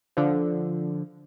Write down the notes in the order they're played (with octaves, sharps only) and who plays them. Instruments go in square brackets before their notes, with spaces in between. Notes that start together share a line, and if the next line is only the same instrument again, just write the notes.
[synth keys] D3 F3